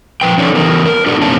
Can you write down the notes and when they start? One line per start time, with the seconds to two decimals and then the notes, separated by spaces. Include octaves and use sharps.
0.21 F3 B4 G5
0.38 F3 C#4 D#4 A4 C#5 D5
0.55 E3 B3 A#4
0.86 A#4
1.06 D4 F#4 G4 A4 B4 D5
1.21 F#2 C3 A#3 C#4 A5